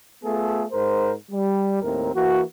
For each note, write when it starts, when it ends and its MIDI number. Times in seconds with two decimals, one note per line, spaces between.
0.24 0.64 57
0.24 0.64 59
0.24 0.64 65
0.24 0.64 68
0.24 0.64 69
0.72 1.12 44
0.72 1.12 70
0.72 1.12 72
1.31 1.82 55
1.82 2.12 39
1.82 2.12 45
1.82 2.12 60
1.82 2.12 70
2.15 2.42 52
2.15 2.42 58
2.15 2.42 66